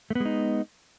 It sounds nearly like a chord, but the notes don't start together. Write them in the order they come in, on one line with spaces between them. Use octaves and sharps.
A3 B3 G#3 D#4